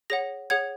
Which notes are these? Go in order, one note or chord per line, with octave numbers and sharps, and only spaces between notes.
G#4 C#5 F#5 A#6
G#4 C#5 F#5 G#6